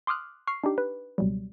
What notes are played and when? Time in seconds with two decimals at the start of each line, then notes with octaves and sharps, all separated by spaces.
0.07 C6 D6 D#6 F6 F#6
0.47 C#6 F6 C7
0.64 D4 D#4 G4
0.78 B4
1.18 C#2 B2 F#3 G3